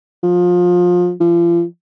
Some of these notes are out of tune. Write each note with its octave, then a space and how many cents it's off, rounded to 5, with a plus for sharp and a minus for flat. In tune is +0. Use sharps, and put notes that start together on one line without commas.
F3 +25
F3 -35